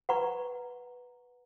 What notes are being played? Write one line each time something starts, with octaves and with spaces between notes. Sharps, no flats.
B4 F#5 A#5 C#6